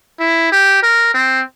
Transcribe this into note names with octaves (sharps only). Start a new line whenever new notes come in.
E4
G4
A#4
C4